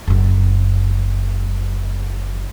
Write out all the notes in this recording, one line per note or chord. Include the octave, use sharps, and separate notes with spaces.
F#1 F#2